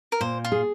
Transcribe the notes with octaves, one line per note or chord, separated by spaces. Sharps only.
A#4
A#2 C5
F4
G#4